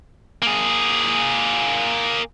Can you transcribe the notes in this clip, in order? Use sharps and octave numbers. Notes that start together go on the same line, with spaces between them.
A#3 G#4